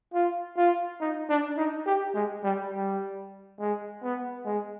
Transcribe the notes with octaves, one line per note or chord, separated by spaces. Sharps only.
F4
F4
D#4
D4
D#4
G4
G#3
G3
G3
G#3
B3
G#3